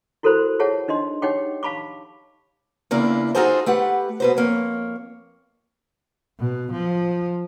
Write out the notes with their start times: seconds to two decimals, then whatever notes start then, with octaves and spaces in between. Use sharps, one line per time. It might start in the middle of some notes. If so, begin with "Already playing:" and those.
0.23 E4 F#4 A4 A#4 C5 B5
0.59 F4 G#4 C#5 E5 F#5 A5
0.88 D4 D#4 D#5 C6
1.22 D#4 G4 C#5 F#5 G5 D6
1.63 F5 A5 B5 C#6 D6
2.91 E2 C#3 A#3 D4 E4 F4
3.35 D#4 F4 F#4 G#4 A4 C5
3.66 A3 G4 B4 F#5
4.20 B2 B4 C5
4.37 F2 A#3 C#5
6.39 B2
6.72 F3